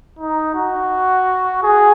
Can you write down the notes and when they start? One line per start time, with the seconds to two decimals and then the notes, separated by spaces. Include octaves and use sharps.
0.19 D#4
0.55 F#4
1.63 G#4